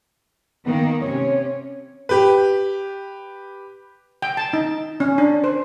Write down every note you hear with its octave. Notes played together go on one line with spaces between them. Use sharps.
D#3 A#3 B3
C3 C#4 C#5
G4 B4
G5
A5
D#4
C#4
D4
C5